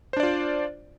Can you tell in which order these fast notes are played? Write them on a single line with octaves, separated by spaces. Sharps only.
C5 D4 D5 F4